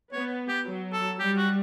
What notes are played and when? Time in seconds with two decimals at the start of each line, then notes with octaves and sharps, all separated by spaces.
0.12 B3 C#5
0.48 G4
0.66 F#3
0.93 A4
1.19 G3 G4
1.38 F#4